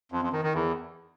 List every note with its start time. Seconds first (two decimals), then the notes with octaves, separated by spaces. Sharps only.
0.12 F2
0.22 F2
0.33 D#3
0.43 D#3
0.54 E2